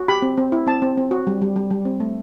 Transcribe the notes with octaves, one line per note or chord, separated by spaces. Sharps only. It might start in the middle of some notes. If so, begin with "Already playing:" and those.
Already playing: F#4
G4 B5
C4
C4
E4
C4 A5
C4
C4
F#4
G3
G3
G3
G3
C4
A3